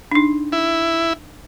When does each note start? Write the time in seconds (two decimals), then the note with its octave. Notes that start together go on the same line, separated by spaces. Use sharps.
0.12 D4 D#4
0.52 E4